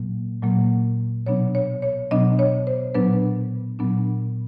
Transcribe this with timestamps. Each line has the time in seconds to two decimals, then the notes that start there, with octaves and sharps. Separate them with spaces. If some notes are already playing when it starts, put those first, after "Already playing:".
Already playing: A#2 F#3 A#3
0.42 A#2 F#3 A#3
1.26 B2 F#3 B3 D4 C#5
1.55 C#5
1.82 C#5
2.11 B2 F#3 B3 D4 D#5
2.39 C#5
2.67 C5
2.95 A#2 F#3 B3 D4 B4
3.79 A#2 F#3 B3 D4